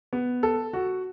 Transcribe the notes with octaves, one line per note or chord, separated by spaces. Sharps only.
B3
A4
F#4